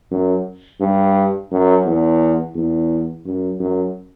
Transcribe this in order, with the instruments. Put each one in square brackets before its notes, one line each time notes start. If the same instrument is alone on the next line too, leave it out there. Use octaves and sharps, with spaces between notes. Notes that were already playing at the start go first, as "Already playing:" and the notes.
[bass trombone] F#2
G2
F#2
E2
E2
F#2
F#2